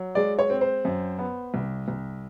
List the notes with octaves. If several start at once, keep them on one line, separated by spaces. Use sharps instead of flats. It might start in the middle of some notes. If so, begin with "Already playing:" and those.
Already playing: F#3
G#3 D5
C#5
C4
C5
F#2
B3
C2
C2